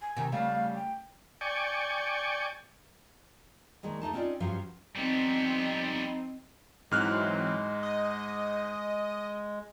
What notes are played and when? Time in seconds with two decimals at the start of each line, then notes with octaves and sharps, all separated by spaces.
0.02 G#5
0.17 C3 D#3
0.32 C#3 G3 A3 F5
0.75 G5
1.41 D5 G5 G#5 C#6
3.83 D2 D#3 G#3 A#3
4.01 D2 A3 D#4 A5
4.13 C4 C#4 D#4 F4 D5
4.40 G2 F3 F#3 C#4 C5
4.96 F3 G3 B3 C4 D#4
6.91 G#2 E3 F#3 G#3 C4 F6 F#6
7.83 D#5